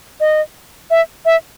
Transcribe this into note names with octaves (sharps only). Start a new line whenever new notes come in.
D#5
E5
E5